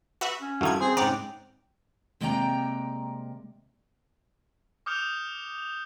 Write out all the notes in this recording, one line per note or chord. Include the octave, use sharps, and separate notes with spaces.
F#4 B4 E5
C#4
G2 D#3 E4 F#4 A4 F5 G#6
C4 G#4 C5
G#2 C#3 C4 D5 F#5 G5 A#5
C3 G#3 A#3 D5 G5 A#5
D6 D#6 F6 G6 C#7 F7